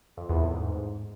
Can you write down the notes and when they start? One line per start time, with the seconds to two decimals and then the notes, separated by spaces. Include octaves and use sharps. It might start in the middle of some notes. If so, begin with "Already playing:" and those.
0.17 F2
0.29 E2
0.41 A2
0.53 G#2